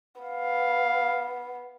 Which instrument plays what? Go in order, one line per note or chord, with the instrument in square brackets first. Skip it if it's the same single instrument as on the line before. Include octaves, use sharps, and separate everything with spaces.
[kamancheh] B3 [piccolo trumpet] F5